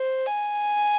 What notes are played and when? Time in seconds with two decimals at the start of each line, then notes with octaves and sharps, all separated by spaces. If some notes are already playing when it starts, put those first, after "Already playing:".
Already playing: C5
0.26 G#5